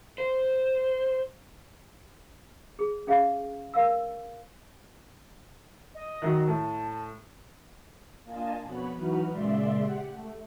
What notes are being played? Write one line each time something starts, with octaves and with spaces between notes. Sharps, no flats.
C5
G#4
C#4 G#4 E5 F5
A#4 F5 E6
D#5
D#3 F#3
A2 A5
A#3 D4 F4 D#5 G#5 A5
F2 B2 B3 B4 C#5 B5
E3 F#3 D#4 F#4 B4 F6
A#2 C#3 G#3 D5 E5 C6
G4 F#5
A3